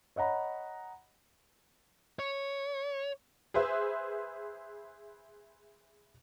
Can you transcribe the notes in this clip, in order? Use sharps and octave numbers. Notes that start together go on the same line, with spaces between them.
C#5 D#5 F#5 A#5 B5
C#5
G#4 B4 C5 E5